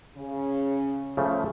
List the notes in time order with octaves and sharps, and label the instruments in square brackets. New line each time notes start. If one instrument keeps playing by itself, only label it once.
[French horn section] C#3
[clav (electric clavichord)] C#3 F3 A3